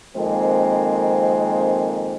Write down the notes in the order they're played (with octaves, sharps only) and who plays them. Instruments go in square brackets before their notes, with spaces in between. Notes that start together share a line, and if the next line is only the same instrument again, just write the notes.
[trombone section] F2 D#3 G#3 A#3 C4